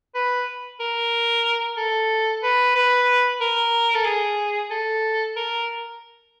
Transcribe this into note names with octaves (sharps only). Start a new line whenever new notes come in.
B4
A#4
A4
B4
B4
A#4
A4
G#4
A4
A#4